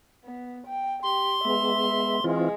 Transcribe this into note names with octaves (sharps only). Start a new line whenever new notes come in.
B3
G5
G4 C6
G#3 B3 E5
E3 G#3 C4 F4